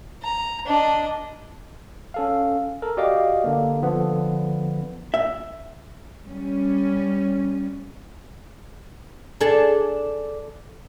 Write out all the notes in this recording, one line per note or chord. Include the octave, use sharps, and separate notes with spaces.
A#5
D4 D#5
C#4 A4 F5
A4 A#4
F#4 G4 D5 D#5 F5 D6
D3 A#3
D3 F3 B3
E5
G3 C#4
D4 G#4 A4